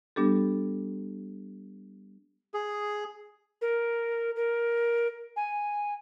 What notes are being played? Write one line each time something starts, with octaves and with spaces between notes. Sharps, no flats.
G3 B3 D4 G4 A4
G#4
A#4
A#4
G#5